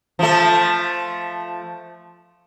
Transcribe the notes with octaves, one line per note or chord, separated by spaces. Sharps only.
F3 A3